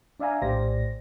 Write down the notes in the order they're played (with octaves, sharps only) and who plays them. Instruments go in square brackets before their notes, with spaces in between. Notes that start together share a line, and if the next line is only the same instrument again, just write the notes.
[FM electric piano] D4 D5 E5 F5 G#5 A#5
A#1 A2 G4 C5 D5 A#6